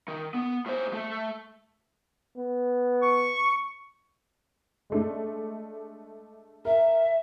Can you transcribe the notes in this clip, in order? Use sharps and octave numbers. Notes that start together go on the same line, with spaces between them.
D#3
B3
A2 C5
A3 A4
B3
C#6
G#3 A3 D4
A#4 E5